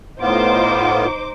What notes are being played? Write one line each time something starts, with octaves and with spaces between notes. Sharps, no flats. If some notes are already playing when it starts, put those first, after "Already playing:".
A2 B3 D#4 F4 C5 D6